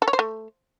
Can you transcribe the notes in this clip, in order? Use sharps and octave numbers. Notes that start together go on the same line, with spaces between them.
A4
C#5
C5
A3